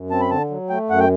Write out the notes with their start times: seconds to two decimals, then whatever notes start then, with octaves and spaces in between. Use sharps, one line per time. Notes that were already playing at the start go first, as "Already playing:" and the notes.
Already playing: F#2
0.11 C4 A5
0.20 B5
0.30 D3 A5
0.50 F#3
0.70 A3 G5
0.90 F#2 F#5
1.00 G5